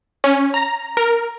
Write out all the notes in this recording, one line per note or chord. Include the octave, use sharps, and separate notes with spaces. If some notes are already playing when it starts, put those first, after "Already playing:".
C#4
A#5
A#4